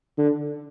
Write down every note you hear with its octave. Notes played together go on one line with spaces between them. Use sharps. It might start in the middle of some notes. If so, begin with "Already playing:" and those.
D3